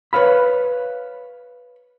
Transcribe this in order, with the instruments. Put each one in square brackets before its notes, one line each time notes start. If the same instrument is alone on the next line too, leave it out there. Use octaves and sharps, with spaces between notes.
[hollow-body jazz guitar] B4 C#5 F5 B5